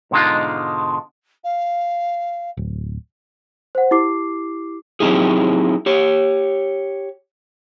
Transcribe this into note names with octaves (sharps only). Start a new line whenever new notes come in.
G#2 B2 D3 G#3 D#4 F4
F5
D1
C5 F#5
E4 G4 D6 C7
F#3 C4 D#4 E4 G4 G#4
G4 C#5